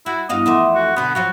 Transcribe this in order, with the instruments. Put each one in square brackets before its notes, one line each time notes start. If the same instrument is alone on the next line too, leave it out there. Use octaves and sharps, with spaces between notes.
[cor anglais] E4 [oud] F#4
[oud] G2 F#4 F5 [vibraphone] B3 E4 [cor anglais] D#5
[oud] F2 E3 A3 [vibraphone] F#5 C6 D6
[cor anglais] F#4
[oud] B2 D3 [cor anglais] B3
[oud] F3 F#3 F4 [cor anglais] F#4 [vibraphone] B5